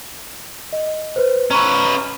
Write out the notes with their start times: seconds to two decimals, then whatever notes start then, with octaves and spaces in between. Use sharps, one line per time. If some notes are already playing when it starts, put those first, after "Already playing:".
0.73 D#5
1.16 B4 C5
1.51 C#4 B4 A#5 C#6